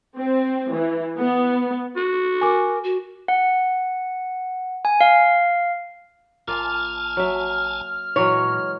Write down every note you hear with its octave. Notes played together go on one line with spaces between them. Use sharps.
C4
E3
B3
F#4
A#4 G#5 D6
F#4
F#5
G#5
F5
A1 A#3 F4 G#5 A5 F6
F#3 E5
A#2 E3 F#3 G#3 C#5